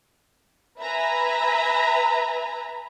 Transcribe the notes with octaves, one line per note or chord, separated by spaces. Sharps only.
B4 E5 G#5 A#5 B5